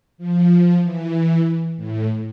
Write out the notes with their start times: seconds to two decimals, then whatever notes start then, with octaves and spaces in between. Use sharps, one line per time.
0.18 F3
0.82 E3
1.77 A2